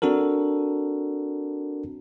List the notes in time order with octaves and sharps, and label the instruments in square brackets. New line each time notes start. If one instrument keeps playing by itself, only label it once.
[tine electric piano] C4 D4 F#4 A4 A#4